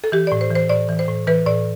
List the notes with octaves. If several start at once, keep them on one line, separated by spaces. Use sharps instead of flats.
A4
E3 G4
A2 D5
C5
E3
C5
A2 D5
E3
C5
A2
E3 B4
A2 D5